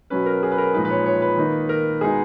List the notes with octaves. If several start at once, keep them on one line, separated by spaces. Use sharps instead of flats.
B2 F#3 C#4 B4
A#4
G#4
B4
A#4
A#2 F3 G#3 D#4 B4
B4
C#5
C#5
B4
D#3 A#3 D#4
A#4
B2 G#3 B3 D#4 G#4